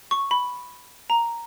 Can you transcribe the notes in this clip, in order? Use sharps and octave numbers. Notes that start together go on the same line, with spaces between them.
C#6
B5
A#5